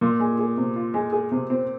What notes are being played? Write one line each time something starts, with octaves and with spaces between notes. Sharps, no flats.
A#2 F4
G#3
G#4
C3
F4
G#3
G#4
C3
C4